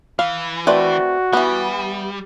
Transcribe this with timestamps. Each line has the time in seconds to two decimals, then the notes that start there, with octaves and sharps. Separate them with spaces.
0.19 E3 F5
0.67 A3 C4 F#4 B4 D5
1.33 E3 G3 B3